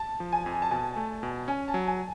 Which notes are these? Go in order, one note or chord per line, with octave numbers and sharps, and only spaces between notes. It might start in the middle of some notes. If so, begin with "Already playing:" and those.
Already playing: A5
F3
G#5
F2
A5
B2 G#5
A3
B2
C#4 G#5
A5
F#3
G#5